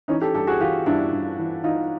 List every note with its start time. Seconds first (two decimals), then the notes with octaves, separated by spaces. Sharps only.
0.08 E3 C#4 D#4
0.21 G4 A4
0.34 G2 G4 A4
0.47 F#4 G#4
0.60 E3 F4 G4
0.86 G2 D4 E4
1.12 G2
1.39 E3
1.64 E3 D#4 F4